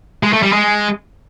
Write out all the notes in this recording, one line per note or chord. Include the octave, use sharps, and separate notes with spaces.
G#3
A3
G3
G#3